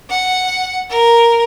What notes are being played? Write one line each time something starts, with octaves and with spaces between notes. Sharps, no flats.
F#5
A#4